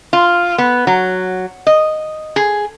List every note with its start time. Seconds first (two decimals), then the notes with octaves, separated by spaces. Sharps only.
0.13 F4
0.58 B3
0.87 F#3
1.67 D#5
2.36 G#4